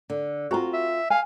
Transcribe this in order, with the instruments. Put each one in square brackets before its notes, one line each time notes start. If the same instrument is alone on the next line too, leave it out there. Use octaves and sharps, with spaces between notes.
[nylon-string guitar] D3
[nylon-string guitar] C4 F4 [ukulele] F#4 A#5
[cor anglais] E5
[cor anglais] F5 [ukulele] G#5